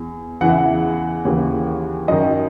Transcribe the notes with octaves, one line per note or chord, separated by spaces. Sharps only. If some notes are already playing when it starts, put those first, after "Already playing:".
Already playing: E2
E2 C#3 E3 F#5
E5
F#5
D#2 C#3 E3
F#2 D#3 D#5